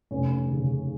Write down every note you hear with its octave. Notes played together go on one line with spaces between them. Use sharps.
F1 C#4
D#2 C#3